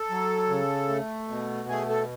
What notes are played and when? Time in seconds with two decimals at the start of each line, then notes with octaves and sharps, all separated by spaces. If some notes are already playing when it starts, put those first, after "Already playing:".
Already playing: A4
0.10 F#3
0.49 C#3
0.89 A3
1.28 B2
1.69 A3 G#4
1.89 A4